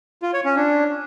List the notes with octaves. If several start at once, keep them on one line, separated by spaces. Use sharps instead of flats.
F4
C#5
C#4
D4